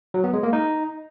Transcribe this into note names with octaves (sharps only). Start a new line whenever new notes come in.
F#3
B3
G#3
A#3
D#4